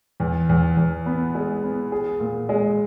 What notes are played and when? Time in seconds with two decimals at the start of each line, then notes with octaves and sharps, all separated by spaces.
0.20 E2
0.49 E2
0.77 E2
1.06 B3
1.35 G#3
1.63 B3
1.92 G#4
2.20 A#2
2.49 G#3